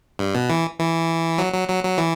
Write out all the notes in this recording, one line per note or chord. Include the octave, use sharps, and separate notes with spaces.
G2
B2
E3
E3
F#3
F#3
F#3
F#3
E3